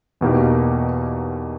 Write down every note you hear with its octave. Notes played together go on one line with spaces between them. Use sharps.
E2 B2 A#3 D#4 G4